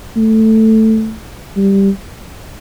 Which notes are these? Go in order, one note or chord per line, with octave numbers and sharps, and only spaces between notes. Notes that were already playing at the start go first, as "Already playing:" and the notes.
A3
G3